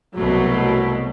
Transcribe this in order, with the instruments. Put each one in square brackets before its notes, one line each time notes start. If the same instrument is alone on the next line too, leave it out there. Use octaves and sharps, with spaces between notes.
[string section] C2 B2 F#3 A3